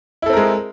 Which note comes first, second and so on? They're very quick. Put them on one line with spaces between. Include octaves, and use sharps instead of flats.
E4 A4 C4 A#4 G#3